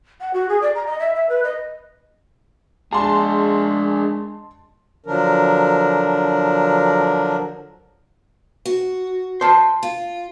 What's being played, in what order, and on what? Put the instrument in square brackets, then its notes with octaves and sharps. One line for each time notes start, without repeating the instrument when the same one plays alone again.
[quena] F#5
F#4
G#4
D5
A#5
D#5
E5
E5
B4
D#5
[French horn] G#3 [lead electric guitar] D4 G#4 [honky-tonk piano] A5 C6
[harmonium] D3 F3 F#3 D4 A#4
[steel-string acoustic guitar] F#4
[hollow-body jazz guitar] C5 A5
[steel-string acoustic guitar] F4